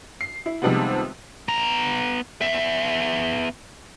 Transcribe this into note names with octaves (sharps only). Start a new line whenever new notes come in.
C7
E4
C3 D#3 F3 G3 G#3 B3
B3 A#5
B3 E5